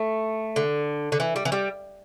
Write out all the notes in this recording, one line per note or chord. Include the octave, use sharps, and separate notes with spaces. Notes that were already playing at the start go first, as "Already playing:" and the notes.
Already playing: A3
D3
D3
E3
G3
E3
G3